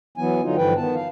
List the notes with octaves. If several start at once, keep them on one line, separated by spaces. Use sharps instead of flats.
E3 F#3 B3 G#5
D3 F#3 D#4 F4
G2 D3 E3 F3 B4 G5
D#3 B3 A5
F5